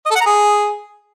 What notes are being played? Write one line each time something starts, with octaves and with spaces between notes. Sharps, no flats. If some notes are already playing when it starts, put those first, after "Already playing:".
D#5
A4
F#5
A#5
G#4